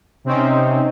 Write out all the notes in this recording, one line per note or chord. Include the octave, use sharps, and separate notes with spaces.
C3 C4 C#4 D#4